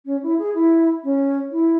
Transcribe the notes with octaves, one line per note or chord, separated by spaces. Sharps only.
C#4
E4
G#4
E4
C#4
E4